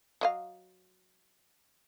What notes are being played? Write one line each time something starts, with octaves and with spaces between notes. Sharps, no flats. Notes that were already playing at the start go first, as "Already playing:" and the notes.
F#3 D#5 F5